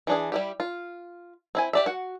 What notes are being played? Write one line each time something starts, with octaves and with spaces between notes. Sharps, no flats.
E3 D4 G#4
G3 E4 G4
F4
C4 E4 G#5
G4 D5 E5
F#4 F#5